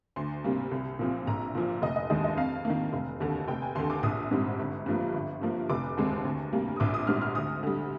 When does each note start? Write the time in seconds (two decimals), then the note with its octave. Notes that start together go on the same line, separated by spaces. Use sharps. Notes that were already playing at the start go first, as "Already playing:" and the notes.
0.16 D2 C6
0.44 C3 G3 A#3
0.71 C2
0.99 A#2 F3 C4
1.27 A#1 A#5
1.55 A#2 F3
1.82 F1 D#5
1.96 D#5
2.10 D#2 D#3 G#3 D#5
2.24 D#5
2.37 F2 F5
2.65 D#3 A#3
2.93 F1
3.20 D#2 D3
3.48 F1 G5
3.62 G#5
3.75 D#2 D3 C6
3.90 D6
4.03 A#1 D#6
4.31 G#2 G3 C4
4.59 G1
4.86 G2 F3 A#3
5.14 G1
5.42 G2 F3 A#3
5.69 F1 D6
5.97 D#2 D3 G#3 C4
6.25 D2
6.53 C3 G3 A#3
6.76 D#6
6.80 A#1 D6
6.94 D#6
7.07 G#2 G3 F6
7.22 F6
7.35 D2 D#6
7.63 D3 G3